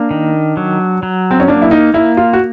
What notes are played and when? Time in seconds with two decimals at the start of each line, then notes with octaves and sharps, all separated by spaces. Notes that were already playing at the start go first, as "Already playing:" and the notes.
Already playing: A#3 D4
0.11 D#3
0.57 F#3
1.03 F#3
1.31 C4
1.40 C#4
1.48 A#3 D4
1.62 E4
1.71 D#4
1.94 A#3 E4
2.17 F4
2.33 F#4